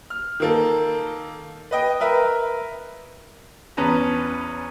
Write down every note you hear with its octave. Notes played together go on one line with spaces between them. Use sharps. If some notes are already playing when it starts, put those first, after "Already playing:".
F6
D#3 A#3 A4
B4 D#5 G5
A#4 B4 E5
E2 C#4 B4 A5 A#5